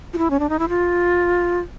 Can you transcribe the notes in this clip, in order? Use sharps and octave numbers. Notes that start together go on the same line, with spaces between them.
F4
E4
C#4
D4
D#4
E4
F4